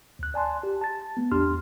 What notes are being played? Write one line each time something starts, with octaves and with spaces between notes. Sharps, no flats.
D2 F#6
D5 G#5 A5 C6
G4
A5 A6
A3 B3
A1 E2 D4 G4 C6 F6